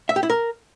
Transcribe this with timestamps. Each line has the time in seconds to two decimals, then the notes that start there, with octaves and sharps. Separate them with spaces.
0.09 E5
0.16 G4
0.23 E4
0.30 A#4